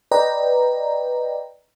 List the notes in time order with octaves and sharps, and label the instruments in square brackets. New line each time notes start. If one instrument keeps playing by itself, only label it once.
[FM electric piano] B4 D5 D#5 G5 A#5